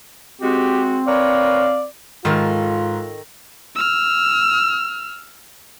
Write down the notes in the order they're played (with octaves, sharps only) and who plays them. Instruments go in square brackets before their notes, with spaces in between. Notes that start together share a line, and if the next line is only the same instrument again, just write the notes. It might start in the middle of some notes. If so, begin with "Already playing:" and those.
[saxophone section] G#3 F#4 [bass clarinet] C4 [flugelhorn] G4
[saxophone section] A#4 B4 C#5 [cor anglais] D5 [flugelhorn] F5
[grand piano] G#2 [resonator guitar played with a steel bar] D#3 A4 A#4 [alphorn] F4
[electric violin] E6 F6